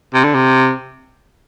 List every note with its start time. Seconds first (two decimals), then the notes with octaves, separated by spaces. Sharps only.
0.14 C3
0.24 D3
0.34 C3